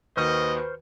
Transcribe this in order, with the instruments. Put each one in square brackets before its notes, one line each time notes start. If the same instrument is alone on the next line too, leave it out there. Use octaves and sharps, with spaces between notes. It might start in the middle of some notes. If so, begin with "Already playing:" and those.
[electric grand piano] D#2 D#3 F#4 [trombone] B4 [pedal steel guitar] C5 C#6 F6 [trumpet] D#5